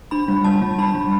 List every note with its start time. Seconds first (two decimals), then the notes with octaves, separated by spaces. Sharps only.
0.11 D4 B5
0.28 G3
0.44 G3 A5
0.61 G3
0.78 D4 B5
0.95 G3